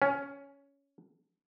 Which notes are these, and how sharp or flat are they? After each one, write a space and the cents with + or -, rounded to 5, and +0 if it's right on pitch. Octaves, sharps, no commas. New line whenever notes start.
C#4 +10